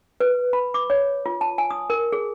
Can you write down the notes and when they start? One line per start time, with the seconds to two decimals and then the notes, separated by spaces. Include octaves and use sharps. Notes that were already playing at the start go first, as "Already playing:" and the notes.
0.20 B4
0.53 B5
0.74 D6
0.90 C#5
1.26 F4
1.41 A5
1.58 G#5
1.71 D#6
1.90 A#4
2.12 G#4